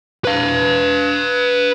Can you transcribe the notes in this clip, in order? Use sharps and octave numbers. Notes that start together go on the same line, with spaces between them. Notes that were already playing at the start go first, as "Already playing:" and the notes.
B4 F5